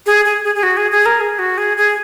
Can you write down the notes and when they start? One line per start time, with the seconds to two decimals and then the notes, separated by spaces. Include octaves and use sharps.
0.06 G#4
0.25 G#4
0.44 G#4
0.55 G#4
0.63 F#4
0.77 G#4
0.91 G#4
1.06 A#4
1.21 G#4
1.39 F#4
1.58 G#4
1.77 G#4